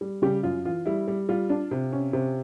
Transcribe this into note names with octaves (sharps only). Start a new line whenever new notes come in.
G3
C#3 G3 G4
F#2 F4
E3 F4
G3 E4
G3
G3 F4
D4
C3
C#4
C3